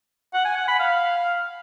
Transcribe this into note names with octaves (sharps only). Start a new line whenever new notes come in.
F#5
G#5
F#5
B5
F5